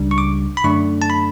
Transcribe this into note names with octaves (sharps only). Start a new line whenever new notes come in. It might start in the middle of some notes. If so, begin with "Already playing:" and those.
Already playing: C#2 C#3 G3 D4
C#6
D6
B5
F#2 D3 A3 D4 C#6
A5
B5